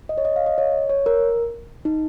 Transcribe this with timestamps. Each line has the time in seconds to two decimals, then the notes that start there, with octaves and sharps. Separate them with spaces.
0.09 D#5
0.18 C#5
0.25 D#5
0.36 F5
0.46 D#5
0.58 C#5
0.89 C#5
1.06 A#4
1.85 D#4